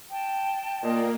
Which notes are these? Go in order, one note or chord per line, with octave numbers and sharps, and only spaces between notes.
G5 A5
A#2 A#3 D#5